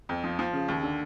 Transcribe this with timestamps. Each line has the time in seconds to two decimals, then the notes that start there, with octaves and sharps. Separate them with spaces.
0.09 F2
0.24 F3
0.39 F3
0.53 C#3
0.68 D#2
0.83 D3